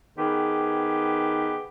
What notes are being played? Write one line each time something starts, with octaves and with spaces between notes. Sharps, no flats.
D#3 B3 G4 G#4 B4